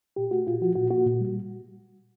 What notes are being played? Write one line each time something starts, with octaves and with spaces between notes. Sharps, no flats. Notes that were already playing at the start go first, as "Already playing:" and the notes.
A#2 G4
A3 F#4
A#2 F4
F3 F#4
A#2 F#4
A#3 F#4
A#2
G3